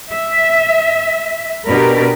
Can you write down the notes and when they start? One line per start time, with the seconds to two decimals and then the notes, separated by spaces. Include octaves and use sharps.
0.11 E5
1.67 B2 D4 G4 A#4 B4